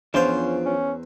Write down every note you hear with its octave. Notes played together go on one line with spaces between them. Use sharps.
E2 F3 C#4 D4 F4 C5
C#4